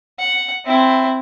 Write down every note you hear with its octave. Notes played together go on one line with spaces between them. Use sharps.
F#5
C4 E4